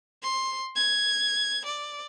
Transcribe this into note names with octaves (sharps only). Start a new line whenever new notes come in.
C6
G#6
D5